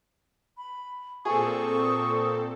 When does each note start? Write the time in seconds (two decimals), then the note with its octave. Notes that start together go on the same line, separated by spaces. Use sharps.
0.57 B5
1.25 A#2 C4 G#4 A4 C#6 D#6